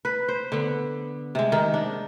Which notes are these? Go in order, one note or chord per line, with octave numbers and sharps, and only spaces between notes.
B4
C5
D3 B3
C3 G#3
D#3
D4